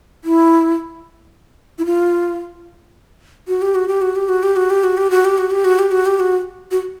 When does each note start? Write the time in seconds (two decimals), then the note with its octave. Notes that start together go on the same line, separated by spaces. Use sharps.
0.24 E4
1.78 E4
1.86 F4
3.48 F#4
3.62 G4
3.75 F#4
3.88 G4
4.02 F#4
4.16 G4
4.29 F#4
4.43 G4
4.56 F#4
4.70 G4
4.84 F#4
4.97 G4
5.10 F#4
5.25 G4
5.38 F#4
5.51 G4
5.65 F#4
5.79 G4
5.91 F#4
6.06 G4
6.20 F#4
6.71 F#4